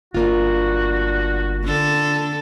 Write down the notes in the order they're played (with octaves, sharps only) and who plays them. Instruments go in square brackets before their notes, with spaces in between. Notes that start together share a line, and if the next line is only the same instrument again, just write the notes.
[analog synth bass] G1 [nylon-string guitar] A#3 F4 [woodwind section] D4 F#4
[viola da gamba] D3 A4